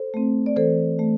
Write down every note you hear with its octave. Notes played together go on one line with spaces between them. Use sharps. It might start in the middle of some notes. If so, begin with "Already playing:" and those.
Already playing: A4 C5
A3 C4
D5
E3 A4 C5
A3